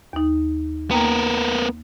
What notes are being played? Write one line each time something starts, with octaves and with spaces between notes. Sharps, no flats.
D#2 D#4
A#3 B3 A#4 G5 A#5